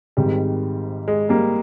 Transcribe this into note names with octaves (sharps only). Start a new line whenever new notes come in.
G#1 G#2 D#3 G3
G#3
G3 A#3